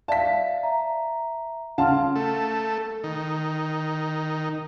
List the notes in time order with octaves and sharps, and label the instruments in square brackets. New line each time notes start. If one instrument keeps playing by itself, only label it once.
[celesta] D5 E5 F5 [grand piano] A5 B6
[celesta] E5 A#5
[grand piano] C#3 F5 A5 [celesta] F#5 C6 F6
[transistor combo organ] A3
D#3